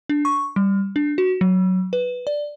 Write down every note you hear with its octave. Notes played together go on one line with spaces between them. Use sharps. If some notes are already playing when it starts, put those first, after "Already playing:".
D4
C#6
G3
D4
F#4
F#3
B4
D5